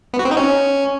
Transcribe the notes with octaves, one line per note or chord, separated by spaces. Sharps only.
B3
F#4
C4
D#4
C#4